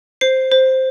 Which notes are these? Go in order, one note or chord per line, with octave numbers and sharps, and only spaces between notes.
C5 C7
C5